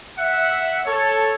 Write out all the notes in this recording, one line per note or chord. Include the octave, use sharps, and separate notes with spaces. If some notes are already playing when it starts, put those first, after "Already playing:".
E5 F#5
A4 C#5